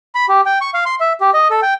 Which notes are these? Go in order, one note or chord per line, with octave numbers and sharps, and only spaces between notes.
B5
G4
G5
C#6
F5
C6
E5
G4
D#5
A4
G5